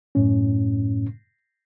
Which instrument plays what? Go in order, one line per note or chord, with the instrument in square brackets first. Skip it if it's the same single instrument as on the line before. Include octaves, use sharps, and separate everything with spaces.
[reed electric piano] F#2 A2 C#4